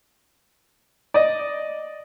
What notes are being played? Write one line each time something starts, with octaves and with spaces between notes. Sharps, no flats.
D5 D#5